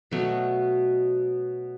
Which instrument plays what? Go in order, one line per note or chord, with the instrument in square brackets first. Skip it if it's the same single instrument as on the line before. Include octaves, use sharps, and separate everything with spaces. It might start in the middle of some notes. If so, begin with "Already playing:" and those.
[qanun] B2 F#3 A3